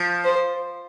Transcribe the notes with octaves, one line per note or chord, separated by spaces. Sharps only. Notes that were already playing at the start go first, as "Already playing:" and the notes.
Already playing: F3
C5